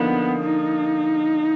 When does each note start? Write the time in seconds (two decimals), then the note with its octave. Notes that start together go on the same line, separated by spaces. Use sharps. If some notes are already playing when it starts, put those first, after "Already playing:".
Already playing: D3 F3 A#3 B3 D#4
0.44 D#4